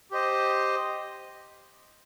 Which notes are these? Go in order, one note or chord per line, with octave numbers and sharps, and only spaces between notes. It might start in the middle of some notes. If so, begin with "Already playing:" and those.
G4 C5 D#5